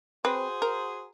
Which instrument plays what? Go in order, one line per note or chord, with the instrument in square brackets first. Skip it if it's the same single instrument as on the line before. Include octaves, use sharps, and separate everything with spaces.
[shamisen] C4 B4 [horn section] F#4 G#4 C5
[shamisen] A#4